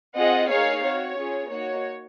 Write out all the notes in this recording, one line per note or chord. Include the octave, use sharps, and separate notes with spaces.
C4 F4 G#4 D#5 F#5
A#3 D#4 G#4 C#5 F5
C4 F#4 C#5
C#4 F4 G#4
A#3 D#4 F#4 C#5